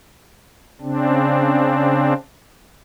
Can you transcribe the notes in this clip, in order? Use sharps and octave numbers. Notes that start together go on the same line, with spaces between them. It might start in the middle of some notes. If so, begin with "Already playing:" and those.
C#3 C4 D4